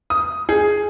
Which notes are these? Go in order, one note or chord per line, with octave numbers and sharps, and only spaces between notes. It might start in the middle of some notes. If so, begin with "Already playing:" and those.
D#6
G#4